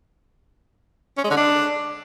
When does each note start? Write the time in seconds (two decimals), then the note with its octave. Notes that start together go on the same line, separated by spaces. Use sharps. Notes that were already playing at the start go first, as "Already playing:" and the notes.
1.18 C#4
1.24 G#3
1.31 D3
1.37 D4